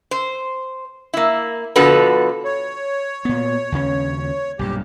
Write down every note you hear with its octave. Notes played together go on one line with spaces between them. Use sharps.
C5
A#3 E4
B2 D3 F3 F#4 A4 B4
C#5
A#2 B3
D#2 C#3 C#4
B1 G2 A#2 G4